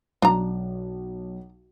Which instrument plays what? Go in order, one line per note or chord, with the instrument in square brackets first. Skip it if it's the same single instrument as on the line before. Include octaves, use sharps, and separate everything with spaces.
[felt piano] B1 [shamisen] D4 A#5